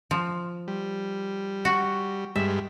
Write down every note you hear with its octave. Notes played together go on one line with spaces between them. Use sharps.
F3
G3
F#4
G2 G3 G#3 E5